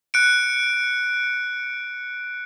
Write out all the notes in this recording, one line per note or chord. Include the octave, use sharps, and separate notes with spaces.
F#6 C#7 D7